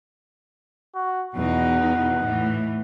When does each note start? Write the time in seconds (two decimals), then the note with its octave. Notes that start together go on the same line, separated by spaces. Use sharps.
0.95 F#4
1.35 E2 B2 D#4 F#5
2.24 A2 E3